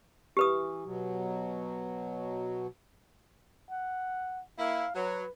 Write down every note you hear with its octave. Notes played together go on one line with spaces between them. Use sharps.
E3 G4 B4 D#6
B2 F#3
F#5
A#3 E4 F5
F#3 B4